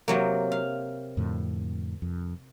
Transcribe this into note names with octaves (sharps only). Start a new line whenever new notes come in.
C3 F#3 A#3
F5
F2 A2 D3
F2